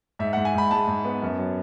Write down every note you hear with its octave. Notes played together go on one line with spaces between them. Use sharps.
G#2 E5
G#2 F#5
G#5
G#2 B5
G#3 A5
G#2
B3
F#2
F#3